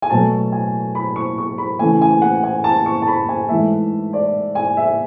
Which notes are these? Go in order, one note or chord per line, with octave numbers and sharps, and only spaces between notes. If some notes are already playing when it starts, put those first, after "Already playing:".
G#5
B2 F#3 A3 A5
G#5
B5
C#6
C#6
B5
C#3 E3 A3 G#5
G#5
F#5
G#5
A5
C#6
A5
B5
G#5
G#2 E3 A3 E5
D5
G#5
E5